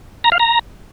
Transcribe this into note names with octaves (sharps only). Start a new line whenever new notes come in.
A#5
F5
A#5